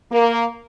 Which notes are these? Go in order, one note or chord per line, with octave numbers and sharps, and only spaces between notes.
A#3